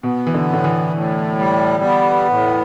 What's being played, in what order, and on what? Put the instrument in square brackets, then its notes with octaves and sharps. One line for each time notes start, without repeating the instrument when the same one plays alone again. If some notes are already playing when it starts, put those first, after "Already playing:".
[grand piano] B2 [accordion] B3
[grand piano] E3
D3
[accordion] A2
[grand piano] D3
E3
[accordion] A2
G3
B3
A2